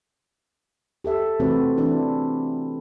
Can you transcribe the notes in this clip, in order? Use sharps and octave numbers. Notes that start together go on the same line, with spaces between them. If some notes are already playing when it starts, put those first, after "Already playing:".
G4 A4 E5
C3 E3 A3 C4 F#4 B4
E3 C4 D4 E4